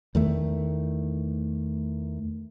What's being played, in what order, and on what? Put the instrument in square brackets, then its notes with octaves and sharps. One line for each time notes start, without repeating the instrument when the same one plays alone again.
[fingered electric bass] E2 D#3 A3